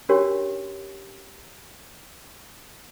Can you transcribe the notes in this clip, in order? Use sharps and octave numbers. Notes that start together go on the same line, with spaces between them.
C#4 D4 F#4 G4 A#4 C#5